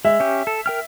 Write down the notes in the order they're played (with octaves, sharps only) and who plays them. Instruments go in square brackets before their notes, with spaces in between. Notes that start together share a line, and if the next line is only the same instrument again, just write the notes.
[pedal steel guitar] G#3 [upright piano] E5
[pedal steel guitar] C#4 G4
A4
A#4 G5 F6